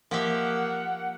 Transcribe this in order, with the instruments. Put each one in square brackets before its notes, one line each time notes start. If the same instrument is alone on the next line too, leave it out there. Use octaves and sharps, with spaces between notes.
[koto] F3 G4 E5 [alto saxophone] A#3 [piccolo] F#5